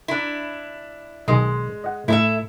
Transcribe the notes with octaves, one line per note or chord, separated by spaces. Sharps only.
D4 E4
B1 D#3 G#3 G#4
D#5 F#5
A2 E4 A4 E5